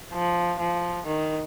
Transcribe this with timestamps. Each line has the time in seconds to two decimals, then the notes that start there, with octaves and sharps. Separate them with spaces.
0.13 F3
0.59 F3
1.06 D#3